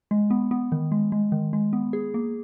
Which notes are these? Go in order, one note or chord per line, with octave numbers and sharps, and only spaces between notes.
G#3
B3
B3
D#3
G#3
G#3
D#3
G#3
B3
G#4
A#3